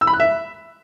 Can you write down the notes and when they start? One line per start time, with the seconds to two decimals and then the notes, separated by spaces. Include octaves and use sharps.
0.01 E6
0.07 B5
0.14 F#6
0.20 E5